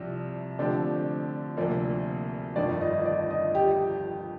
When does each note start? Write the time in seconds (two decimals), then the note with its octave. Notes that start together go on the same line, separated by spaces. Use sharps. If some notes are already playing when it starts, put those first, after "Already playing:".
Already playing: C2 C3 F3 D5
0.59 D3 F3 A3 C4 G4 D5
1.57 D2 C3 F3 A#3 D5
2.56 G1 F2 D#3 D5
2.81 D#5
3.06 D5
3.31 D#5
3.55 G4